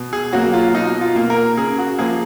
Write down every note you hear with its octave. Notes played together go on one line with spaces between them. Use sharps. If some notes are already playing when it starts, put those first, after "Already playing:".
Already playing: B2
G#4
F#3 A#3 F#4
F4
B2 D#4
F4
A#3
A#4
C#3 G#4
F#4
F3 A#3 G#4